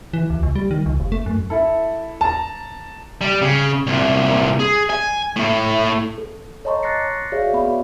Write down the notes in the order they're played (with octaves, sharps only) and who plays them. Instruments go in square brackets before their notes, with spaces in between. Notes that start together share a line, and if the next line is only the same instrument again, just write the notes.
[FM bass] E3
D2
C#2
G3
D#3
C#2
F1
A3
F#2
[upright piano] E4 A4
A5 A#5
[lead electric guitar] G3
C#3
C2 A#2
G#4
G#5
A2 A3
[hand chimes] A4
C#5 D#5 A5 A#5 C6 C#6
D6 F#6 A6 A#6 C7 C#7
F#4 G#4 C#5 D5 E5 F5
B3 F#4 D5 E5 B5